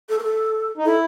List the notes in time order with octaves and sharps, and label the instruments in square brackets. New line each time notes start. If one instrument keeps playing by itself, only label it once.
[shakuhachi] A4
A#4
A4
[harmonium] D#4
[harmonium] E4 [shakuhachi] A4